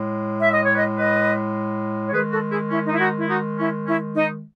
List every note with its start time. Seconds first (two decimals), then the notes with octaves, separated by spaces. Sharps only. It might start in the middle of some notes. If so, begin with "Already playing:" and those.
Already playing: A2 G#3
0.40 E5
0.52 D#5
0.64 C#5
0.75 B4 D#5
0.97 B4 D#5
2.06 C#5
2.13 D#3 G#3 G#4 B4
2.32 F#4 A4
2.51 E4 G#4
2.70 C#4 E4
2.85 D#4
2.92 E4
2.99 D#4 F#4
3.18 E4
3.28 D#4 F#4
3.58 C#4 E4
3.87 C#4 E4
4.15 D#4